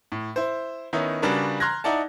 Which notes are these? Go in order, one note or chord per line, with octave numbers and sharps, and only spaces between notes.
A2
E4 C5
D#3 B3 C#4 D#4 E4
C#3 G3 D4 F#4 A#4 B4
A#5 C6 F6 F#6 G#6 A#6
D#4 E4 D5 F#5 A5